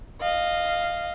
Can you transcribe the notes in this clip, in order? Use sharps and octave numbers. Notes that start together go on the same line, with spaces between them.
D#5 F5